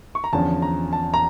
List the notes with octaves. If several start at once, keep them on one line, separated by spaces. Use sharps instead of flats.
C#6
A#5
E2 D3 F3 C#4 A5
A#5
A5
A#5